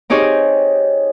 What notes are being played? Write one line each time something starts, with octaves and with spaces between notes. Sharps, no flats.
C4 D#4 G4 G#4 C#5